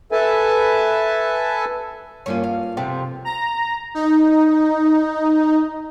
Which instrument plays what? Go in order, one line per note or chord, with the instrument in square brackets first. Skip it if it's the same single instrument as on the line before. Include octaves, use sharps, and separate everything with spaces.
[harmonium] A4 B4 E5 G#5 A5
[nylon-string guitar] G2 A#3 F4 [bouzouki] C#4
[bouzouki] F5
C3 F3 A3
[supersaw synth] A#5
D#4